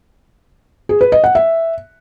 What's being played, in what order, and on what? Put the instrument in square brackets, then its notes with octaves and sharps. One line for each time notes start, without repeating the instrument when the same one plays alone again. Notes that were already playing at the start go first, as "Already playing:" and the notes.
[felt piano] G#4
B4
D#5
F#5
E5